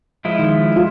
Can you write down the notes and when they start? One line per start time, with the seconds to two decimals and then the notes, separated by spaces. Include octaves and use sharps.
0.25 F3 G#3 E4
0.39 D#3
0.76 F4